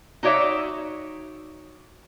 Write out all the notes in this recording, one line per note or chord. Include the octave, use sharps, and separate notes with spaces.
D#4 F#4 C#5 D5 E5